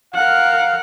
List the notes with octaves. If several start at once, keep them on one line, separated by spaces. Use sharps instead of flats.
A#4 F5 F#5